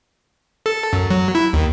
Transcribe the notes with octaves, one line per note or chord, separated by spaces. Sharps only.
A4
F#2
F#3
E4
D#2